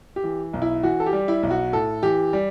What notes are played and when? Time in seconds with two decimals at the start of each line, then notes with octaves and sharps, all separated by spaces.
0.16 G4
0.24 E3
0.53 B1
0.62 E4
0.83 E3 F#4
1.00 A4
1.06 G4
1.13 G3
1.28 E4
1.43 B1
1.51 F#4
1.73 A2 A4
2.03 E3 G4
2.33 G3